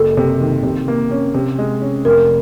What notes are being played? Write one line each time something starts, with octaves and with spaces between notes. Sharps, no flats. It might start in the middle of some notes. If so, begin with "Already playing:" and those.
Already playing: F#1 A4
C3
D#3
C3
A#3
C#4
C3
G#3
C#4
F1 A#4